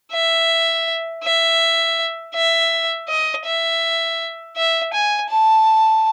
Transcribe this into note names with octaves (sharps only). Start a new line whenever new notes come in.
E5
E5
E5
D#5
E5
E5
G#5
A5